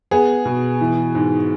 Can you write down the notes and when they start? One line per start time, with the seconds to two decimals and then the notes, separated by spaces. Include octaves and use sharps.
0.11 B3 G#4
0.45 B2
0.81 E3
1.15 G#2